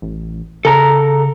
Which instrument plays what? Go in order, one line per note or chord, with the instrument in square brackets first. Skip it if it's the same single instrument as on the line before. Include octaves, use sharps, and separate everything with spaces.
[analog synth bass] A1
[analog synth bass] C#3 [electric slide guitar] A4 A#5